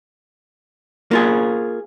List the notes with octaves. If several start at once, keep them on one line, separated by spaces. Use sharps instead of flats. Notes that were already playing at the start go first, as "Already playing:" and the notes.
A#3 F4 G#4